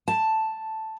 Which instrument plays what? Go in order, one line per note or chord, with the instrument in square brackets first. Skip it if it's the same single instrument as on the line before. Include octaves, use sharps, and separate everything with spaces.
[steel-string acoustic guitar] A5